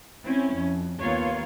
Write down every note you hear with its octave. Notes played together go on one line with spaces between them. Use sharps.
C4 C#4 E4
F2
D#2 A#3 B3 F4 C#5 F5